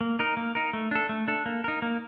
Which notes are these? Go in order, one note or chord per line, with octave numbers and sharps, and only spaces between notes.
A#3
D#4 A#4
A#3
D#4 A#4
A3
D4 A4
A3
D4 A4
A#3
D#4 A#4
A#3